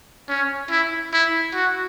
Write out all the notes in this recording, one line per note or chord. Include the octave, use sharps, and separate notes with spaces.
C#4
E4
E4
F#4